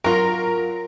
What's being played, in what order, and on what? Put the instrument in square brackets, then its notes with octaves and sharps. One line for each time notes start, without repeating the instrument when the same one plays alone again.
[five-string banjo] F#3 F4 [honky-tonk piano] A#4